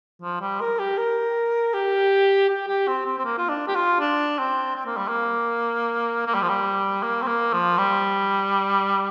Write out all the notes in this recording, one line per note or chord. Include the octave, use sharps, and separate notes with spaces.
F3
G3
A#4
G4
A#4
G4
G4
G4
C4
C4
C4
A#3
F4
D4
G4
F4
D4
C4
C4
A#3
G3
A#3
A#3
G3
F3
G3
A#3
C4
A#3
F3
G3